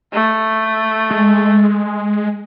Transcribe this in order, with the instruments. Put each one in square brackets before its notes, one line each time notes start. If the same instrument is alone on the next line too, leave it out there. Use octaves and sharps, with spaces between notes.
[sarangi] A3
[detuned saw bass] G#3